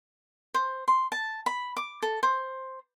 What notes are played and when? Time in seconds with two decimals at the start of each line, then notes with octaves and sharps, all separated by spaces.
0.54 C5
0.88 C6
1.12 A5
1.46 B5
1.77 D6
2.02 A4
2.23 C5